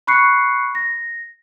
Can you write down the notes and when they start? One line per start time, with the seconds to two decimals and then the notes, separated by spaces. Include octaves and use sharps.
0.07 B5 C#6 F#6 C7 C#7
0.75 A#6